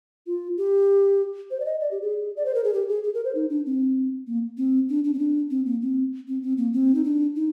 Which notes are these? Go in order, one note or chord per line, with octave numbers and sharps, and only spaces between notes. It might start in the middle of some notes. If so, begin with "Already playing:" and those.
F4
G4
C5
D5
D#5
D5
G4
G#4
D5
C5
A#4
G#4
G4
G#4
G#4
A#4
C5
D#4
D4
C4
A#3
C4
D4
D4
C4
D4
C4
A#3
C4
C4
C4
A#3
C4
D#4
D4
D#4